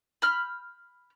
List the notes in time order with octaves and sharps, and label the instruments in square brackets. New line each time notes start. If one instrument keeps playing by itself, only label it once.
[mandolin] B5 F6 G6